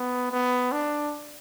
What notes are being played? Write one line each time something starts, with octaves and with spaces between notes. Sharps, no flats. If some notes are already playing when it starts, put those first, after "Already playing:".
Already playing: B3
B3
D4